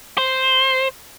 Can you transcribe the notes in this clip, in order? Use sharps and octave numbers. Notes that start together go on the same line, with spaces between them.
C5